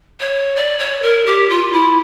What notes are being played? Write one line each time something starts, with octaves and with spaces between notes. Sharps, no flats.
C#5
D5
C#5
A#4
G4
F4
E4